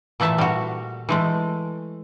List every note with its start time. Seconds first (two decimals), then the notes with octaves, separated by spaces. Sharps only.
0.20 A#2 E3 A3 E5 A5
0.38 G3 F#4
1.09 E3 G#3 A3